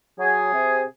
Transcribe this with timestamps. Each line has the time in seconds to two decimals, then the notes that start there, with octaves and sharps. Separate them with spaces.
0.19 F#3 G#4
0.53 C3